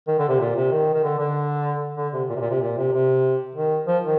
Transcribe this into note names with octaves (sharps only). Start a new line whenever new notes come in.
D#3
D3
C3
A#2
C3
D#3
D#3
D3
D3
D3
C3
A#2
C3
A#2
C3
A#2
C3
C3
D#3
F3
D#3